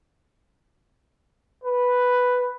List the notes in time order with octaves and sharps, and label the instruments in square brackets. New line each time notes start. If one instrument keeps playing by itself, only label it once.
[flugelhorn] B4